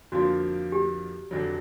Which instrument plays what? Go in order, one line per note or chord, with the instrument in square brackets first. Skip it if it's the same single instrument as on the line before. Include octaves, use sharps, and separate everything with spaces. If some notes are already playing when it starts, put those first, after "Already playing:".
[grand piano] F2 D3 F3 A#3 D4 [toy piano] F#4
[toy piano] G4
[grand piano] F1 F2 D3 F#3